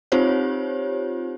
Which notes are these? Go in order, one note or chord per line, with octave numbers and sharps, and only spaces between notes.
C4 D#4 F4 G4 C5 C#5